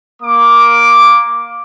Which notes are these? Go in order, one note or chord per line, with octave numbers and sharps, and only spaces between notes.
A#3 D6